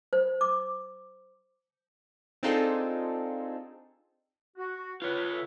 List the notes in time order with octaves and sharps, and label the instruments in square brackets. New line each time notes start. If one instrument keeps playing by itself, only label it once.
[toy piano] C5
D6
[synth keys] C4 D4 D#4 F4 G#4 A4
[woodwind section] F#4
[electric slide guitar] F4 C#5 [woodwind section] B4
[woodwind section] A4 B4 E5